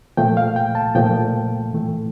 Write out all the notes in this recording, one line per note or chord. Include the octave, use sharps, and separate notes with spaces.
A#2 F3 A3 G5
F5
G5
A5
A#2 F3 A3 G5
A2 E3 A3